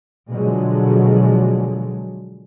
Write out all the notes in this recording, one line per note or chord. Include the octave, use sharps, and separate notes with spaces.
B2 D3 F3 F#3 G#3